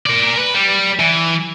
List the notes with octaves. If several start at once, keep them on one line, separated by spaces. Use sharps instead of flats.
A#4 D5
B4
G3
E3